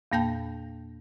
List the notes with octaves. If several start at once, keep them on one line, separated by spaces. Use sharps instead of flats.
E2 A#2 A#3 G5 A5 G6